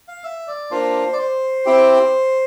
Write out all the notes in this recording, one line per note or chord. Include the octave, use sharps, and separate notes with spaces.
F5
E5
D5
A#3 D4 F4 C5
D5
C5
C4 E4 G4